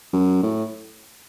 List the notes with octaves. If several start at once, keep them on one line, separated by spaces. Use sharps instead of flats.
F#2
A2